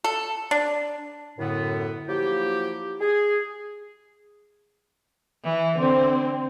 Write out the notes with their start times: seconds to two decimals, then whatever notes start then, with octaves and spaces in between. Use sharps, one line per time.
0.04 A4
0.51 D4
1.39 F#2 A2 D3 B3
2.08 F3 F#3 A#3 E4 G4
3.00 G#4
5.43 E3
5.79 D3 C4